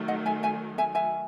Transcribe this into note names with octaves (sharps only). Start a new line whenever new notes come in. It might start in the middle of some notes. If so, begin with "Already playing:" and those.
Already playing: D#3 F#3 A3
D#5 F#5
E5 G#5
E5 G#5
E5 G#5
E5 G#5